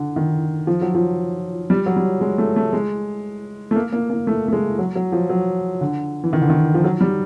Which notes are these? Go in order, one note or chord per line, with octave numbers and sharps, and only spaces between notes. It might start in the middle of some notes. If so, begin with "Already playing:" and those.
Already playing: D3
D#3
F3
F#3
F3
G3
F#3
G3
G#3
A3
A3
G#3
A3
A#3
A#3
A#3
A3
A3
G#3
F#3
F#3
F3
F#3
D3
E3
D#3
D3
D#3
F3
F#3
G3